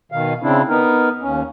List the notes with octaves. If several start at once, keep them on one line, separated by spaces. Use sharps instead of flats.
B2 D#3 F5
C#3 C4 D4 E4
B3 D#4 A#4
D#2 C#4